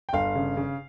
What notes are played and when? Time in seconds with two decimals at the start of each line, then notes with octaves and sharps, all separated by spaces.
0.09 G5
0.13 G1 F5
0.35 C#3
0.57 C#3